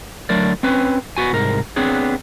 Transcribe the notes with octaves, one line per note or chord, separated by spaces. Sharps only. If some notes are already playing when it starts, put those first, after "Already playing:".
D3 F#3 A3 A#4 D5
C4 C#4 B4
B3 F#4 G#5
C2 G#2 A#4
B3 C4 D4 G#4 C#5